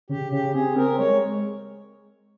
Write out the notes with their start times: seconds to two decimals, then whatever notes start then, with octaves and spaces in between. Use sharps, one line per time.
0.09 C#3 G4
0.32 C#3 G4
0.54 C4 G#4
0.76 C4 A#4
0.98 G#3 C#5